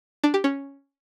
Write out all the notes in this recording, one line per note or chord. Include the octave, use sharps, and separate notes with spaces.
D4
G4
C#4